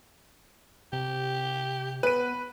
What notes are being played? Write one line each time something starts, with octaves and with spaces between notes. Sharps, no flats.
C3 G4
B3 B4 D#7